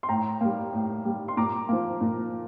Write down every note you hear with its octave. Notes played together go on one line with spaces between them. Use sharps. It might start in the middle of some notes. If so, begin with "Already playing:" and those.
C6
A2 G5 A#5
G3 A#3
A2
G3 A#3
C6
A#2 A#5 D6
F3 A#3
A#2